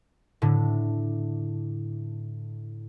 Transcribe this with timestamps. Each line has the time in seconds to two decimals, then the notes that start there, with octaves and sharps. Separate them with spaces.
0.42 A2 D3